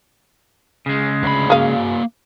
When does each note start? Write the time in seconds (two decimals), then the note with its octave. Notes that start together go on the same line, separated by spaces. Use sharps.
0.86 C#3 G#3
1.23 D2 B5
1.50 A#3 F#4 G#4 F5